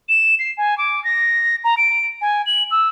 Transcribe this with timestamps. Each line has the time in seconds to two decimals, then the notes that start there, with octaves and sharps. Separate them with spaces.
0.09 E7
0.39 C7
0.57 G#5
0.77 D6
1.04 A#6
1.64 A#5
1.77 D7
2.21 G#5
2.46 F#7
2.71 E6